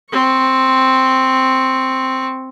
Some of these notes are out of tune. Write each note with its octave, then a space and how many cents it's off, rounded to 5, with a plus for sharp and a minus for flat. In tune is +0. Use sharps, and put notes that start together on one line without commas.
C4 +0 C#6 -5